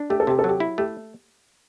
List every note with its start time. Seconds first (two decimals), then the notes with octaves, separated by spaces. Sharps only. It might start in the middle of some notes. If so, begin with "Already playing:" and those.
Already playing: D4
0.10 A3 G4
0.20 A4
0.27 C3 G4
0.39 A4
0.44 F#3 G4
0.60 E4
0.78 A3 G4